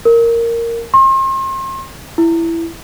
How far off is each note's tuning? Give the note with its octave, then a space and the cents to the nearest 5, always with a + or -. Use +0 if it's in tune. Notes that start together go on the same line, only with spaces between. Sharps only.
A#4 -10
C6 +40
E4 +10